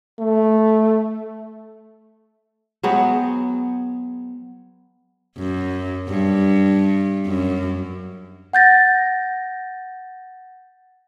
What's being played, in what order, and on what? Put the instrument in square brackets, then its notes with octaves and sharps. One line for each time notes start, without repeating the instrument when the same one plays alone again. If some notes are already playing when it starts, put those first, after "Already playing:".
[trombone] A3
[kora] F#3 G#3 B3 C4
[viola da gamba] F#2
G2
F#2
[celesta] F#5 G6 A6 A#6